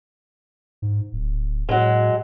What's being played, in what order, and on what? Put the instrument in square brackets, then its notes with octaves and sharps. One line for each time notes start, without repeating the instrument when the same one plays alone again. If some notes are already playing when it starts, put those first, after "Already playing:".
[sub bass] G#2
D1
[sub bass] A2 [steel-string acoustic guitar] F#3 G#3